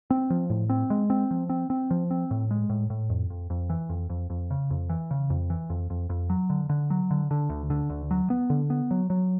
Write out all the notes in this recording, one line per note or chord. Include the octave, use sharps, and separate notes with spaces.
C4
F3
A2
C4
G#3
C4
F3
C4
C4
F3
C4
A2
G#3
A2
A2
F2
F2
F2
E3
F2
F2
F2
C#3
F2
E3
C#3
F2
E3
F2
F2
F2
F#3
D3
D3
F#3
D3
D3
D2
D3
D2
F#3
B3
D3
B3
F#3
F#3